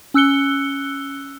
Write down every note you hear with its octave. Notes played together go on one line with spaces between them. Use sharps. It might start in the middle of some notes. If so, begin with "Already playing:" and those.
C#4 E6 F#6 C#7 G7